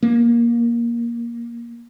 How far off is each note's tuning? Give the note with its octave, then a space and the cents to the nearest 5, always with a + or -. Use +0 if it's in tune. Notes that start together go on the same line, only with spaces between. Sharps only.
A#3 +15